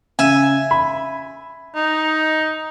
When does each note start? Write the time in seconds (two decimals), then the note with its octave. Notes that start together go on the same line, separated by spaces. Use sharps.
0.19 C#3 E5 G#5
0.71 B5
1.76 D#4